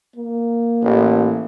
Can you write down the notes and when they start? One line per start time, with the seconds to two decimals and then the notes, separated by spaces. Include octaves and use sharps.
0.16 A#3
0.83 A1